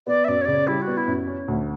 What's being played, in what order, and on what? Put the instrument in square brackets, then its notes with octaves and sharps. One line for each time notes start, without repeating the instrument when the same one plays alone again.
[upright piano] B3 [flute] D5
[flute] E5
[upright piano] F#2 [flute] D5
[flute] C#5
[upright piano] C#3 [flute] D5
[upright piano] G3 [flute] E4
[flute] F#4
[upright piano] B3
[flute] E4
[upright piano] F#2
C#4
D2